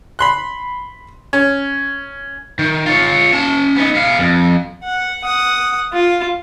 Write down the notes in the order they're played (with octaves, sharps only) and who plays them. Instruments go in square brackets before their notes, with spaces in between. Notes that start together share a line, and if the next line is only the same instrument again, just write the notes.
[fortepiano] B5 C6 F#6
C#4
[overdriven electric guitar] D#3
F4 C#5
C#4 A5
B3 D#4
B3 F5
F2
[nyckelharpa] F#5
F#5 D#6
F4